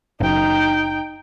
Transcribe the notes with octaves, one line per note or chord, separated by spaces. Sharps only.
F#1 D#4 G5